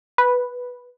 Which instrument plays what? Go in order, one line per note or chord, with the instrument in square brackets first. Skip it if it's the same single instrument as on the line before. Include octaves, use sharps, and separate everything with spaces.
[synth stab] B4